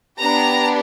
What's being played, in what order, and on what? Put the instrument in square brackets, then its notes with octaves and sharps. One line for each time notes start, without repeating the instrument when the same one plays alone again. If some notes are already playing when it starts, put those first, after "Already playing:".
[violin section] B3 D4 G4 A#5